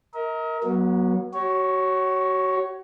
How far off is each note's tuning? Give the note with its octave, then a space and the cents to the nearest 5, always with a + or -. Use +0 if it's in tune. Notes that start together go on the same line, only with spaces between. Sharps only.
A#4 +0 D#5 +40
F#3 +0 B3 -40
F#4 +30 C#5 +0